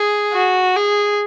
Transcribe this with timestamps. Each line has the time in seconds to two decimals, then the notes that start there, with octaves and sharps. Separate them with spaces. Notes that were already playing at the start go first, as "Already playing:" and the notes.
Already playing: G#4
0.33 F#4
0.76 G#4